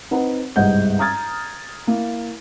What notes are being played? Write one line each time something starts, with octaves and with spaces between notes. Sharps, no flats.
C4 D#4 B4 F#5
G1 C2 G#2 D#5 F#5 G6
A#5 D#6 F6 G#6 A6
A#3 E4